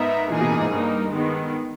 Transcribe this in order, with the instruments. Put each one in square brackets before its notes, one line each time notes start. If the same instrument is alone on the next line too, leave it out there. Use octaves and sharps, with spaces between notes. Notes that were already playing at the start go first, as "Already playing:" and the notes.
Already playing: [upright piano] G#2 [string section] B3 D#4 A#4 E5
[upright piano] A#2 [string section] E3 A#3 D#4 G#4
[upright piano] B2
A#2
G#2
[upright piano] G2 [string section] G3 A#3 D#4
[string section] D#3 G#3 B3